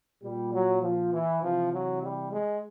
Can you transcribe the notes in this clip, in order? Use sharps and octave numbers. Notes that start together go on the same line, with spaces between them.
A#2 G3
F#3
F3
E3
C3 E3 F3
F#3
G3
G#3